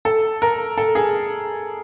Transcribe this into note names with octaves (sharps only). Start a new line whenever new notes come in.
A4
A#4
A4
G#4